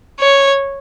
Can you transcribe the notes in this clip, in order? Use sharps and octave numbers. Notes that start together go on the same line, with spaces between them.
C#5